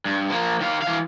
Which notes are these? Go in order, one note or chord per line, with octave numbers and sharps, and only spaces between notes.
G2
F3 A#3
D#3 F5
E3 F5